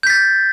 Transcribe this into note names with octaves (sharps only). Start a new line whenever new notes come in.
G6 A6 B6